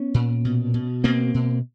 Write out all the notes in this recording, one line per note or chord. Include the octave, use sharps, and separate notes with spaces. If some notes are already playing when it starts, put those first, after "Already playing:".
Already playing: B3 C#4
A#2
B2
B2
B2 A#3 C4
B2